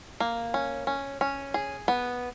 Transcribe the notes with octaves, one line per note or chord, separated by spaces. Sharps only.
A#3
C#4
C#4
C#4
G#4
B3